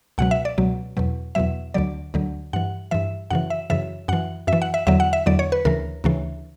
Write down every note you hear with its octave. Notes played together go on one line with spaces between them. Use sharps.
C#2 B2 F#3 F#5
E5
D5
C#2 B2 F#3
E2 B2 F#3
E2 B2 F#3 E5
D2 D3 F#3 D5
D2 D3 F#3
G2 E3 F#5
G2 E3 E5
F#2 C#3 E3 F#5
E5
F#2 C#3 E3 E5
F#2 E3 F#5
F#2 E5
E3
F#5
E5
E2 D3 F#3 E5
F#5
E5
E2 D3 F#3 D5
C#5
B4
D2 C#3 E3 A#4
D2 C#3 E3